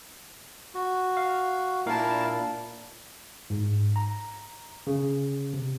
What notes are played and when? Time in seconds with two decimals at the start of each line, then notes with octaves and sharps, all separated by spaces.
0.75 F#4
1.17 F5
1.86 A#2 D4 E4 A#4 F5 A5
3.50 G#2
3.96 A#5
4.87 C#3
5.54 C3